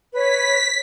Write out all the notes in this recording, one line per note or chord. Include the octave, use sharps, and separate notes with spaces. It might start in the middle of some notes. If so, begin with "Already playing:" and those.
B4 C#5 B6